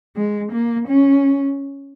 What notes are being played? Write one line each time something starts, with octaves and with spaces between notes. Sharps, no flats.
G#3
A#3
C#4